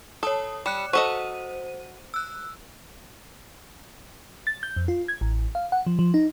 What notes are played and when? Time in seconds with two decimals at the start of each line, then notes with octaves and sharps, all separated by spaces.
0.23 A4 C#5 A5 D#6
0.66 G3 F#6 C#7 E7
0.93 F#4 A4 C5 D#5 D#7
2.14 E6 F#6
4.47 A6
4.63 G6
4.76 F2
4.88 F4
5.08 G#6
5.21 A1
5.55 F5
5.72 F#5
5.87 F3
5.99 F3
6.14 D#4